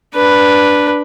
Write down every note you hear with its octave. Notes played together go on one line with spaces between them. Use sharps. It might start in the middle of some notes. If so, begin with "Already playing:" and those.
D4 B4